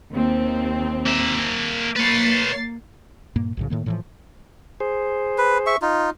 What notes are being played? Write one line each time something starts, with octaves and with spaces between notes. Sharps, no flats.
D#2 C4
A#3 E5
A#3 B4 C#5 A6 C7
G2 A#2 A#3
B1 A2 C#3
A2 D#3 A#3
A2 E3 F3
G#4 C5
B4
E5 C#6
D#4 F4